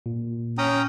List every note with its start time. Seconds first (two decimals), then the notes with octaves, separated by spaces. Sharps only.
0.06 A#2
0.58 C#4 G5 A#5 D#6